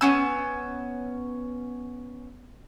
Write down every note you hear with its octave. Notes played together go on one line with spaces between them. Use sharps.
B3 C#4 E6